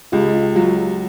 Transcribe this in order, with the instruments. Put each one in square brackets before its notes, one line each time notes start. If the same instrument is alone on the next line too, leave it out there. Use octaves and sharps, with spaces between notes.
[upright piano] C#2 [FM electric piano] F4 G4
[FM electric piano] F4
[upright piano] F#3 [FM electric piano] F4
[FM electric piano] F#4